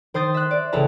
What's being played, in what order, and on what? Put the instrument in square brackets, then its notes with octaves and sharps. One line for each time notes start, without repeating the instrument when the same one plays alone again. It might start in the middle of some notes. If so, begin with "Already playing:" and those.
[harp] D#3 C5 C6 D#6 G6 A6
E5 F#6
D5
A1 C#3 E4 B4 A5 A#5